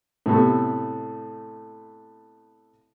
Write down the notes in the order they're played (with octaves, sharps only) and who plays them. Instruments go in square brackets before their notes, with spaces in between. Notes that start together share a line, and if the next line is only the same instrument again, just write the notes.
[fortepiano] A2 C3 A3 B3